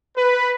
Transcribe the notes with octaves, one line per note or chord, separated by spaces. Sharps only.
B4